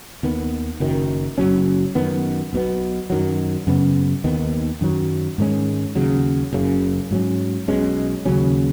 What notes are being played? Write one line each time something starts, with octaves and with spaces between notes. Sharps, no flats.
D#2 D#3 B3
F#1 F#2 D#3
F#1 F#2 F#3 C#4
F#2 D#3 B3
B1 B2 B3
F#2 D#3 F#3
F#2 C#3 B3
D#2 D#3 B3
F#2 D#3 F#3
G#2 D#3 G#3 C#4
D#2 C#3 F#3
F#1 F#2 C#3
G#2 F#3 C#4
B1 B2 G#3 C#4
D#2 C#3 F#3 C#4